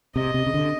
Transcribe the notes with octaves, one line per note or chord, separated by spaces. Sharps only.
C3 D#5
C3
C#3
D3